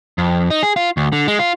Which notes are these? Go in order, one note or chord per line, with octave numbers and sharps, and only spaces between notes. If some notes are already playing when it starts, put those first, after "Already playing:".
F2
D#4
G#4
F4
D2
D3
G#3
F4